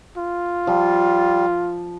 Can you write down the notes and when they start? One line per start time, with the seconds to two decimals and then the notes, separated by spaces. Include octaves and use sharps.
0.18 F4
0.67 F3 G3